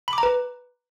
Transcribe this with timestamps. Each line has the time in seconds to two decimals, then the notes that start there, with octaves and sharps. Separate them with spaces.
0.08 B5
0.13 D6
0.18 A#5
0.23 B4